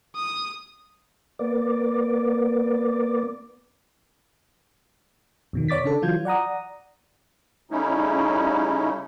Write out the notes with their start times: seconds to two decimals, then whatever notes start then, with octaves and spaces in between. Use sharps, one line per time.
0.16 D#6
1.39 A#3 B3 D5
5.53 F2 B2 D#3
5.68 C#5 D5 D6 A6 B6
5.84 C#3 D4 A4
6.02 E3 F#3 F4 G6 G#6
6.25 D5 F#5 A#5 D#6
7.71 C#3 G3 A3 C#4 D#4 E4